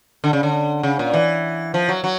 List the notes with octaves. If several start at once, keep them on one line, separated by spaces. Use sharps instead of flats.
D3
C#3
D3
C#3
A#2
E3
F3
F#3
F#3